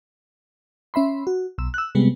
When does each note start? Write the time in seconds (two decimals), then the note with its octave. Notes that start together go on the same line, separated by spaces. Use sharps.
0.94 C#4 E5 B5 C6
1.27 F#4
1.58 B1 E6
1.74 E6 F#6
1.95 C3 G3 G#3 B3